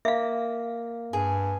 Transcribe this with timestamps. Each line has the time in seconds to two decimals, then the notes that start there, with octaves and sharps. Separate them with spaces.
0.05 A#3 E5 F5
1.13 G2 G#4